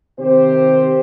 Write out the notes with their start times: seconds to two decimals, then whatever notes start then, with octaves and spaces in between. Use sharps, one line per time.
0.19 C3 D#3 G4 C5